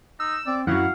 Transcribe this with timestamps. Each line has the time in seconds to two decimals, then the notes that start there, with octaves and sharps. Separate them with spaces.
0.20 D#4 E6
0.47 C4 D5
0.67 F#2 E3 F#3 E4 F5 F#5